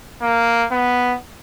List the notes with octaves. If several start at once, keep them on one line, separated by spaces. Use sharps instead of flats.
A#3
B3